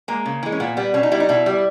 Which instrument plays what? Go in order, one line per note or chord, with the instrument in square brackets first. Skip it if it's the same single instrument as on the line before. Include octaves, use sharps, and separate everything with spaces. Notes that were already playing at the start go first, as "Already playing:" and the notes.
[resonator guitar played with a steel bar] G#3 A#3
C#3
E3 G#3
C#4
A#2 B3
G3 B3
B2 C#4
D#4
G3 E4
D#4
B2 E4
G3